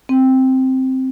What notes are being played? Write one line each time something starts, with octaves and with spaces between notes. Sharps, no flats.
C4